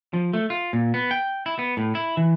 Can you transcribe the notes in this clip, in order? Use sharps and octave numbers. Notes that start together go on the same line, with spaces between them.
F3
A3
F4
A#2
B3
G5
E4
B3
A2
E4
E3